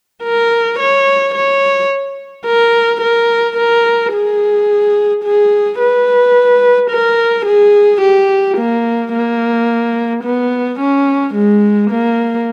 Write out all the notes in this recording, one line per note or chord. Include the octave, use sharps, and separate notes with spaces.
A#4
C#5
C#5
A#4
A#4
A#4
G#4
G#4
B4
A#4
G#4
G4
A#3
A#3
B3
C#4
G#3
A#3